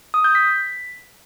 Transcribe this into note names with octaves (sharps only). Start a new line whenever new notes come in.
D#6
G6
B6